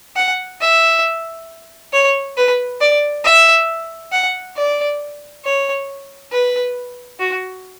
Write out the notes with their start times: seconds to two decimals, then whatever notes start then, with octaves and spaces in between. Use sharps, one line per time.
0.16 F#5
0.61 E5
1.93 C#5
2.37 B4
2.81 D5
3.24 E5
4.12 F#5
4.57 D5
5.44 C#5
6.32 B4
7.19 F#4